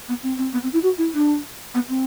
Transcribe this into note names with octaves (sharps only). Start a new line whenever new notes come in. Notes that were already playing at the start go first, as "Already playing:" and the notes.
B3
C4
C4
B3
C4
E4
F#4
E4
D4
B3
C4